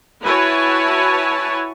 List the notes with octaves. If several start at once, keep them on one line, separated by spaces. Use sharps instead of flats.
E4 F#4 B4 C#5 G#5 A5